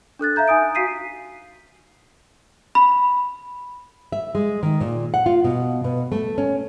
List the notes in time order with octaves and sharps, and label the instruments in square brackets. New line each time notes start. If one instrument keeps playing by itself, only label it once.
[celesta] D4 A4 F#6 A6
E5 F5 A#5 G6
D#4 G#5 D#6 D7
F#4 F5 B6 C7 D#7
B5
[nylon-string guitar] E5
G#3
D#3
A#2
F#5
F4
B2
B2
A3
C#4